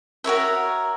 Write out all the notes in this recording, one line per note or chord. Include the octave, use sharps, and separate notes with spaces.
F#4 A#4 C#5 E5